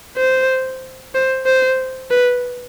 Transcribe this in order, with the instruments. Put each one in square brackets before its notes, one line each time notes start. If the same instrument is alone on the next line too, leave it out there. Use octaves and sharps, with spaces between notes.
[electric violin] C5
C5
C5
B4